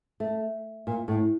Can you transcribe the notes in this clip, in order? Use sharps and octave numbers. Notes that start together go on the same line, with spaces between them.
A3
A#2
A2